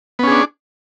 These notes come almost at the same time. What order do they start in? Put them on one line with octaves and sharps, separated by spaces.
B3 C#4 G#4 D4